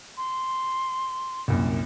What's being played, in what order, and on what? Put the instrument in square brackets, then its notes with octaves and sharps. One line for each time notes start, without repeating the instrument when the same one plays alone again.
[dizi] C6
[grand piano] C2 F#2 A#2